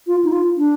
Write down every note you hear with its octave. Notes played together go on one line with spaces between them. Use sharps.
F4
D#4
F4
D4